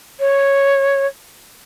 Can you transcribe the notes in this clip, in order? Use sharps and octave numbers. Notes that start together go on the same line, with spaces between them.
C#5